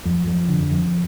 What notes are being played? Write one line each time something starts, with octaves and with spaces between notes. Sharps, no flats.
F2
F2
D3
F2